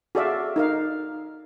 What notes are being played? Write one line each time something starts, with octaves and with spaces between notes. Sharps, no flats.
F#4 G#4 A4 D5 E5 F5
D#4 A#4 F5